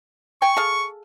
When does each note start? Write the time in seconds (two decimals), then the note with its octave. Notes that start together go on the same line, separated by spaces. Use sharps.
0.42 G5 G#5 C#6
0.57 G#4 A4 F5